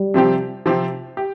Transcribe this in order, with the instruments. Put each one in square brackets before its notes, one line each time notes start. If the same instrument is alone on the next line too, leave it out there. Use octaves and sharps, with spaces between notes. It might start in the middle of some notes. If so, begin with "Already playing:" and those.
Already playing: [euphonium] G3
[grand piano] C3 F3 C4 G4
C3 F3 C4 G4
G4